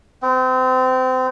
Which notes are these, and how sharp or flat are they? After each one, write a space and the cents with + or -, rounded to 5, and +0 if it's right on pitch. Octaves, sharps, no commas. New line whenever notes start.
C4 -30